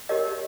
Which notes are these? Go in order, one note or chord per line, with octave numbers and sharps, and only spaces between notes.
G4 A#4 C#5 D#5